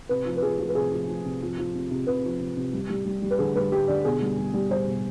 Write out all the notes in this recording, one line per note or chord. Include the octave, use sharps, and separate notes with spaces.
C3 B4
F3
B4
F3 G#4
F3
B4
C3 G#4
F3
F3
C3
F3
F3
C3
C3
C3 B4
F3
C3
C3
G3
G3
G3
G3
B4
D3 G#4
G3 B4
G3 G4
D3 D5
B2 G#4
G3
G3
G3
G3 C5
B2